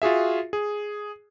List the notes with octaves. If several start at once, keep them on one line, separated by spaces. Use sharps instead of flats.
F4 F#4 G#4 E5
G#4